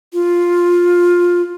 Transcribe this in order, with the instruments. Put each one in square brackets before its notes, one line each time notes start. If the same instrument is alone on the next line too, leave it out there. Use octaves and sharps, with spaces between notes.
[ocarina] F4